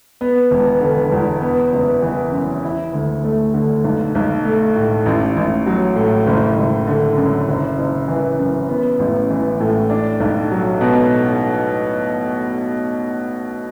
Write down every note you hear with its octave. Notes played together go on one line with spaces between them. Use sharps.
B3
E1
D3
E2
B3
F#1
E3
F#2
E4
D2
A3
D3
B1
B1
A3
A2
A1
A1
F#3
A2
F#1
F#1
D3
F#2
F#1
F#1
E3
F#2
B3
A1
E3
A2
D4
B1
F#3
B2